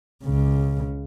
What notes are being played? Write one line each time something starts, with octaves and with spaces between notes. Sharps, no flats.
C#2 C#3